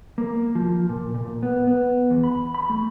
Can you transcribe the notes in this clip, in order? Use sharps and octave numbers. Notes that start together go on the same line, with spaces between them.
A#3
F3
A#2
A#2
B3
B3
E2
B5
B5
A3